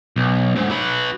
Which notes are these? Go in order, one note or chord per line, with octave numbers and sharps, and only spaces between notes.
B1
D2 G#2
F#3 B4